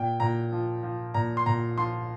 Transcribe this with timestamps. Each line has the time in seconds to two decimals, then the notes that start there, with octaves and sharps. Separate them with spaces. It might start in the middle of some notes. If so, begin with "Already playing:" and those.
Already playing: A#2 G5
0.20 A#2 A#5
0.52 F3
0.83 F3
1.14 A#2 A#5
1.37 C6
1.46 A#2 A#5
1.78 F3 C6